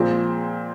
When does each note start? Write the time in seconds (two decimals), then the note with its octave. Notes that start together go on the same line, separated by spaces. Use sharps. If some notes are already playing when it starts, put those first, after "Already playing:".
Already playing: A#2 F3 G#3 C4